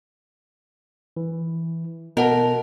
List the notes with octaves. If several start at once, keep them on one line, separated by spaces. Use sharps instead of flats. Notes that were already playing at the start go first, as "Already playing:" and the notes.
E3
B2 A#4 D#5 F#5 A5